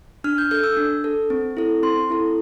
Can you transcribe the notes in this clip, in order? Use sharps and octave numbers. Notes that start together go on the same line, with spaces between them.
D4 F6
G6
A4 G6
E6
D4
A4
C4
E4 A4
C4 C6
E4 A4